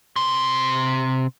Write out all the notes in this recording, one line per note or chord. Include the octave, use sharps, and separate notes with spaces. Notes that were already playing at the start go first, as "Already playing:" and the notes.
C3 C6